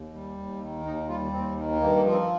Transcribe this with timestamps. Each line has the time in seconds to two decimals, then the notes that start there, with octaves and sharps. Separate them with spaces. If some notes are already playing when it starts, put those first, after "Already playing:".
Already playing: D#2
0.14 G3
0.38 D#2
0.61 D#3
0.85 D#2 D#4
1.08 G3 F4
1.32 D#2 C4
1.57 D#3
1.80 G2 A#3
1.96 A#3
2.04 F3
2.12 C4